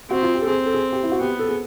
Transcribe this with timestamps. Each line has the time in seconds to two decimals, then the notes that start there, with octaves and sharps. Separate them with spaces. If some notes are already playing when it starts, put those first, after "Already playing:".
0.10 C4 F#4
0.23 F4
0.35 G4
0.42 A4
0.47 C4 G#4
0.66 A4
0.74 G#4
0.93 G4
1.03 E4
1.12 F#4
1.21 B3 G4
1.39 A4
1.48 G#4